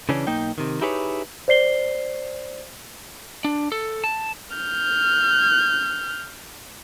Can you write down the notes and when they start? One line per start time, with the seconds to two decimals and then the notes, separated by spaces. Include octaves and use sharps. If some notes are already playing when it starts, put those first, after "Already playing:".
0.09 C#3 E3 C#4 D4
0.27 B1 A#3 D#4 G5
0.58 C3 D#3
0.81 D#4 E4 G4 G#4 B4 C#5
1.48 C5 D5 C7 G7
3.45 D4
3.72 A4
4.04 A5
4.56 F6 G6